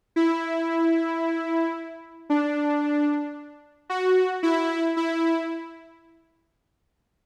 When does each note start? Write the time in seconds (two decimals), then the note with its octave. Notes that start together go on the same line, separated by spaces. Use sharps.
0.16 E4
2.30 D4
3.90 F#4
4.43 E4
4.97 E4